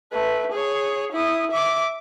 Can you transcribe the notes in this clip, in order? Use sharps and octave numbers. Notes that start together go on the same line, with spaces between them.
A3 B4
G#4 C#5
E4 D#6
E5 D6